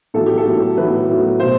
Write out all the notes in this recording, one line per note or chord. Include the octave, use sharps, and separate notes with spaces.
A2 F#3 A4
G4
A4
A2 F#3
A2 F#3 B4
A2 F#3
B2 C5